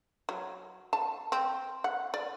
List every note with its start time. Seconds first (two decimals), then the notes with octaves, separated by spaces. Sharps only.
0.29 F#3
0.93 A5
1.32 C4
1.84 F#5
2.14 D5